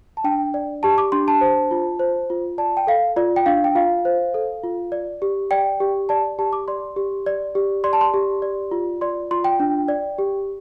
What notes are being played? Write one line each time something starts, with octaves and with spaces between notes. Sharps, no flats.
A5
D4 G5
D5
G4 A5
D6
D4 C6
A5
C5
F4
C5
F4
D5 A5
G5
A4 F5
F4 D5
G5
D4 F5
G5
F4 F5
C5
A4
F4
D5
G4
D5 G5
G4
D5 A5
G4 A5
D6
D5 C6
G4
D5
G4
D5 C6
A5
C6
G4
D5
F4
D5 C6
F4 C6
G5
D4
D5
G4